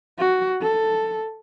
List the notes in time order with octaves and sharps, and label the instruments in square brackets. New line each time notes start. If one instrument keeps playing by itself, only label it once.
[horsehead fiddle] F#4
A4